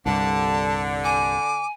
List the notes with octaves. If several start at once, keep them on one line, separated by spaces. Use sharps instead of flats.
C2 G2 D3 A5
G#5 D6